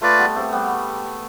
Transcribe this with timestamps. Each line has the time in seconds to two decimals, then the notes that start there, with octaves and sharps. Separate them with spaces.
0.02 A3 F4 B4 D5
0.19 G3 B3
0.36 A3 C4
0.52 G3 B3